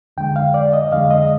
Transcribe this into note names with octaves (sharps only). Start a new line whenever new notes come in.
F2 D3 G#3 G5
F5
D5
D#5
F2 D3 G#3 F5
D#5